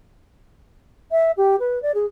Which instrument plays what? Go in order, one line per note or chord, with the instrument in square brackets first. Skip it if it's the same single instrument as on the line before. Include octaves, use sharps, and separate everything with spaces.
[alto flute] E5
G4
B4
D5
G#4